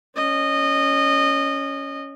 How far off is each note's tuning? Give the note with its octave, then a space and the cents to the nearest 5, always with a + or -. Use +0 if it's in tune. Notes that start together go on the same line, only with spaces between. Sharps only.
C#4 +0 D#5 -20